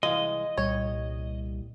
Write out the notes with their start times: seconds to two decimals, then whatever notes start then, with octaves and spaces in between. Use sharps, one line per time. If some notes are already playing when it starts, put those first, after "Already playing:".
0.03 C2 E3 G#3 D#5 F5
0.58 C2 A#2 G3 C#5